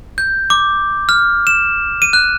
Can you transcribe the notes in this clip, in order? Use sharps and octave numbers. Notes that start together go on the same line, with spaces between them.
G6
D6
F6
E7
D#7
F#6